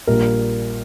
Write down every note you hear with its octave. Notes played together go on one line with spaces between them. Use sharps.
A#1 A#2 G3 A#4